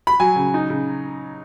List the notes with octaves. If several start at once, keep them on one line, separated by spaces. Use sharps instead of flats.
B5
F#3 G#5
C#3
D#4
C#3